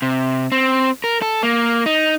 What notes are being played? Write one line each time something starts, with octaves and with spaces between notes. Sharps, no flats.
C3
C4
A#4
A4
A#3
D#4